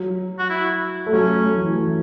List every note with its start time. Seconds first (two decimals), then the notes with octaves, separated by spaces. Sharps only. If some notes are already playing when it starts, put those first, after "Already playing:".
Already playing: F#3
0.39 F#4
0.50 E4
1.06 A3
1.13 F#3 C#4
1.34 A3
1.44 F#3
1.55 E3
1.75 E3